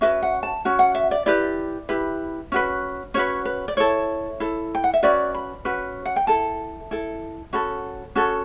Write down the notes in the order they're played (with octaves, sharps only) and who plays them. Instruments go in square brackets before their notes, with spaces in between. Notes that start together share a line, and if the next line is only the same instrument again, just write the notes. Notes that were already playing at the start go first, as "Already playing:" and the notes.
[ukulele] C#4 F#4 B4 E5
F#5
A5
C#4 F#4
F#5
E5
D5
E4 G4 B4 D5
E4 G4 B4
C#4 F#4 B4
C#4 F#4 B4 C#5
B4
D5
E4 A4 C#5
E4 A4
G5
F#5
E5
C#4 F#4 B4 D5
B5
C#4 F#4 B4
F#5
G5
E4 A4 A5
E4 A4
C#4 F#4 A4 B5
C#4 F#4 A4